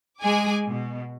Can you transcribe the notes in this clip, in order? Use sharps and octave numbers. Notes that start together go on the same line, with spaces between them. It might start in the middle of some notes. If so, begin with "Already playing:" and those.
G#3 G#4 G#5 D6
B2